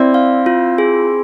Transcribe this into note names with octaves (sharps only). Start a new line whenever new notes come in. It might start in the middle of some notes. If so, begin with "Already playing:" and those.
Already playing: C4 E4 D5
F5
F4
G#4